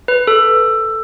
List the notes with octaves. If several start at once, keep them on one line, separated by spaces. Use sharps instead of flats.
B4
A4